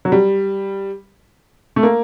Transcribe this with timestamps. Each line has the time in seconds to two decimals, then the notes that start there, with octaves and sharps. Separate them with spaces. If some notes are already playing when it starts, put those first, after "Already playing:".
0.05 F#3
0.12 G3
1.76 A3
1.83 A#3